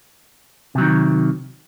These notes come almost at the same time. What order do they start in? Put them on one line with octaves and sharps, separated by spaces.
C3 F#3 D#3